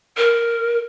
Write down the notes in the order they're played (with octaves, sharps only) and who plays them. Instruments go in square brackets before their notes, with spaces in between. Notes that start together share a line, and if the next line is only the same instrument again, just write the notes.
[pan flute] A#4